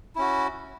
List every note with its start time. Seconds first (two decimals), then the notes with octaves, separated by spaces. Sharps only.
0.16 E4
0.18 C#4
0.21 F#4